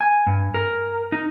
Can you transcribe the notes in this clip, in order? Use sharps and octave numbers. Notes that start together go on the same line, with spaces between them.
G#5
G2
A#4
D#4